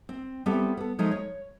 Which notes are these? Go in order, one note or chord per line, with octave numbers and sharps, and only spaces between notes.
C4
G3 B3 C4 E4 G4 A4
B3 A4
F3 G#3 A3 D#4
C#5